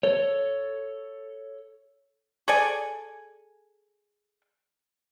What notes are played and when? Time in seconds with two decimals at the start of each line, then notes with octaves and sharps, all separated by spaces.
0.03 A4 C#5
2.48 G#4 A4 D5 G#5